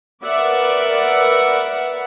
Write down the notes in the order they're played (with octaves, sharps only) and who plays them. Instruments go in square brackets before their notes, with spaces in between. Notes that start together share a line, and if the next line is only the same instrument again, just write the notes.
[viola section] A#4 B4 D5 E5 F#5